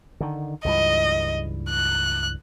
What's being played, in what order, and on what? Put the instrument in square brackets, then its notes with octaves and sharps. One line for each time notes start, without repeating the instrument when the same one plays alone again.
[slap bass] D3 D#3
[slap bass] C#2 G2 E3 [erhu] D#5
[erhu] F#6